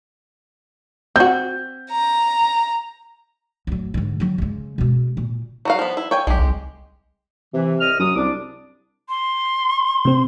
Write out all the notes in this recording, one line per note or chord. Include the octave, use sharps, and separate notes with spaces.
C4 F#4 G6
A#5
F#2 A2
G#2 D3
D#3 F#3
C#3 G#3
B2 G#3
A#2
F#3 F#4 F5
F3 B3
E4
C#5 G5 G#5
B1 G#3 G4
C2
C3 E3
C2 D#5 F6
F#2 D#6
C2 D4 D6
C6
C3 C4